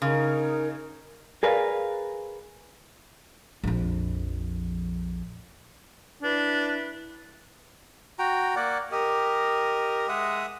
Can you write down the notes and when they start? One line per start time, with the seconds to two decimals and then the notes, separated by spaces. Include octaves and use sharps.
0.02 C#3 D#4 A#4
1.43 G#4 A#4 B4 D5 F5
3.64 A#1 F2
6.23 D4 E4 B4
8.19 F#4 G5 A#5
8.56 A#3 D5 F#5
8.92 G4 A#4 D#5
10.09 G#3 E5 F#5 D#6